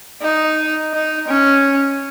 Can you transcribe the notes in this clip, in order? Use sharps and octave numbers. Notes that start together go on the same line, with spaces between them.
D#4
D#4
C#4